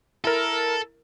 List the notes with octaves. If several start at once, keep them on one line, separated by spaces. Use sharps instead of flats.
E4 A4 A#4